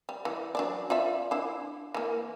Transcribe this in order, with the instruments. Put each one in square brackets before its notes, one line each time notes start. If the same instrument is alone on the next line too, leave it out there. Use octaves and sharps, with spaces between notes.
[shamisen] G3
E3
F#3 D4 D5
F4 D5 E5
D4 E4
E3 A#3